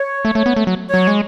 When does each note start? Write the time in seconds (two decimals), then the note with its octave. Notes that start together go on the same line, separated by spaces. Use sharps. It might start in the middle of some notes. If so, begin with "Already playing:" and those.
Already playing: C#5
0.25 A3
0.35 A3
0.46 B3
0.56 A3
0.67 F#3
0.89 F#3 C#5
1.08 G#3